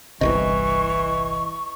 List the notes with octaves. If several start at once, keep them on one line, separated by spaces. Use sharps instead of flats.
G1 C2 C3 E3 D#5 C#6